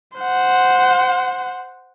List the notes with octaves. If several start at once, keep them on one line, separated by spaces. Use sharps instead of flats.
C5 F#5